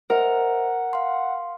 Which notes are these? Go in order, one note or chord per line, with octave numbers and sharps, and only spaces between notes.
A#4 C5 D#5 E5 F#5
F5 C6